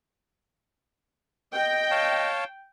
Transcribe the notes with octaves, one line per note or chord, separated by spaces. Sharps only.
D#5 G5
C#5 F5 A5